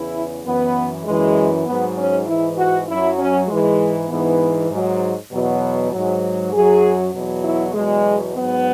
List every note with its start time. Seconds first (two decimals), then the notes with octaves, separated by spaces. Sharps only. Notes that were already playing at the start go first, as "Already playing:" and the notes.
Already playing: E2 C#3 E3 E4
0.45 F#2 E3 B3
1.05 F#2 E3 G#3
1.66 G#2 F#3 B3
1.97 C#4
2.27 G#2 E3 E4
2.58 F#4
2.88 F#2 F#3 E4
3.19 C#4
3.48 G#2 E3 G#3
4.09 G#2 E3 B3
4.70 G#2 F#3
5.31 E2 B2 F#3
5.92 G#2 F#3
6.53 F#2 F#3 G#4
7.13 E2 B2 F#3
7.44 E4
7.74 E2 B2 F#3 G#3
8.36 G#2 F#3 B3